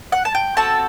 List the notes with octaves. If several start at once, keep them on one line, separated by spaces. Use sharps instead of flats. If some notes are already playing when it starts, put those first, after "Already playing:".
F#5
A5
G5
C4 F#4 A4 A5